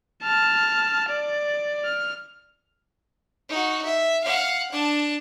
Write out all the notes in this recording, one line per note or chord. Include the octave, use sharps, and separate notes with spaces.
A5 F6
D5
F6
D#4 F#4
E5
F5 F#5
D4 A5